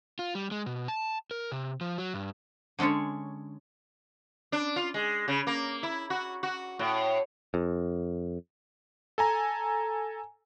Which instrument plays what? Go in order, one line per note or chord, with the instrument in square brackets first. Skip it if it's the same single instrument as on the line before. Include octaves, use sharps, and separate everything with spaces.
[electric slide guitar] F4
G3
G#3
B2
A5
A#4
C3
F3
F#3
G2
[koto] D3 G#3 C#4 D4 C#5
[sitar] D4
F4
G#3
C#3
A#3
E4
F#4
F#4
A2
[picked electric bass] F2
[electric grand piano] A4 G#5 A#5